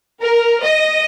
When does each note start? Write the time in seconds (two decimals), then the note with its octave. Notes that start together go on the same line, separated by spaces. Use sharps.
0.22 A#4
0.62 D#5